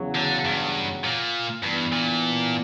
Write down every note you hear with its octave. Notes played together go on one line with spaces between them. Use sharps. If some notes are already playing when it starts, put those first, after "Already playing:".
Already playing: E2 C#3 F#3
D3
G2
A#2
G2 E3 B3 D4
A#2